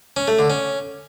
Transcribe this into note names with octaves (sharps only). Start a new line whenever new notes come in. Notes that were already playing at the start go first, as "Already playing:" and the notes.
C#4
A3
D3
C#4